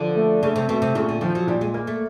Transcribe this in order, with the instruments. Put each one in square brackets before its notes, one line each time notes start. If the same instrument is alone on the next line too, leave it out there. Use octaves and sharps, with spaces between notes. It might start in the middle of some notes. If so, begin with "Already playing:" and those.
Already playing: [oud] D3 [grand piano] F3
[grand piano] A3
[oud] C#3 [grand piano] A3
[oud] C3
[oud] B2 [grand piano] A3
[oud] C3
[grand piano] A#2 [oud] C#3
[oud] D3
[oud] D#3 [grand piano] F3
[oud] F#3
[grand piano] A#2 [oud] G3
[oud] G#3
[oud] G#3 [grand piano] A#3
[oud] A3